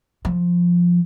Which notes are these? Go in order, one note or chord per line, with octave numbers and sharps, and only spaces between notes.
F3